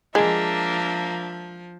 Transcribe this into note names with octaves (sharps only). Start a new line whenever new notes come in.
F3 G#3 A#3 D4 E5